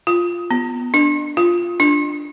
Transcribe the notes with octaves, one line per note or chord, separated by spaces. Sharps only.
F4
B3
D4
F4
D4